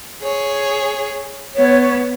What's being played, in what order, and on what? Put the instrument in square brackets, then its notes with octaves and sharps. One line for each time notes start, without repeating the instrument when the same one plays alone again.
[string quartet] G#4 C#5
[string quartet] B3 [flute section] C#5